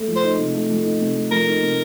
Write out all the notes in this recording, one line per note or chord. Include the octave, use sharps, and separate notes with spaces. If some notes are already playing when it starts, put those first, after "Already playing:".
Already playing: A3
F3
C5
D#4
C3
A3
F3
D#4
C3
A3
F3 A#4
D#4
C3